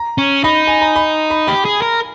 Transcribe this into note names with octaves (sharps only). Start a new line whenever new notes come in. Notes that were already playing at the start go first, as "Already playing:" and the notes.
Already playing: A#5
C#4
D#4 B5
G#5
A#5
B5
B5
G4 B5
G#4
A#4